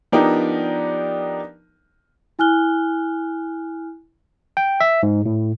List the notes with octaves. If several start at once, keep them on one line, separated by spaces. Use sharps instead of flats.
F3 B3 D4 D#4 G4 A#4
E4 G#5 F6 F#6 G7
G5
E5
G#2
A2